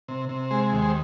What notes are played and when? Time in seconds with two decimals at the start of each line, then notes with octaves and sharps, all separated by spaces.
0.08 C3
0.29 C3
0.51 G#3 C5
0.72 D#2
0.82 C5